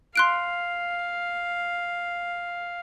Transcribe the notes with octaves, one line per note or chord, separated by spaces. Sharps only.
F5 C6 F#6 D7